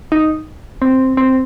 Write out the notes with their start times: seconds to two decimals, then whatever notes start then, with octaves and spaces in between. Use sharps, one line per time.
0.12 D#4
0.82 C4
1.17 C4